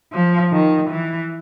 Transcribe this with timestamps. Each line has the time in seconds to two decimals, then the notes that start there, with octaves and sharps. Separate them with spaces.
0.13 F3
0.52 D#3
0.90 E3